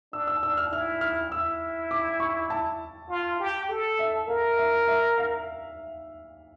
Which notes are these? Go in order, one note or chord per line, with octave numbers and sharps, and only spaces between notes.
D4 E6
E6
D4 E6
F6
E4 F6
F6
E4 E6
D6
C#6
A5
F4
G4
A4
E5
A#4 F5
E5
E5
F5